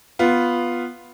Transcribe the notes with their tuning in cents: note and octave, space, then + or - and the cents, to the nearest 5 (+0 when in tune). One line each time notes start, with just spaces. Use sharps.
B3 +0 F4 +0